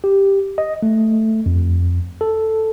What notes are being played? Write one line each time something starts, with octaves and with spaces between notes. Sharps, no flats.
G4
D#5
A3
F2
A4